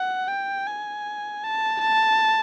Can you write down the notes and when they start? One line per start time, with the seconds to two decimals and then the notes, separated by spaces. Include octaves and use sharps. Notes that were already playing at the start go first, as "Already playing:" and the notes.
Already playing: F#5
0.28 G5
0.67 G#5
1.44 A5
1.82 A5